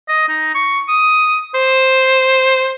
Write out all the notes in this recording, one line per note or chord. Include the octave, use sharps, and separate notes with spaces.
D#5
D#4
C#6
D#6
C5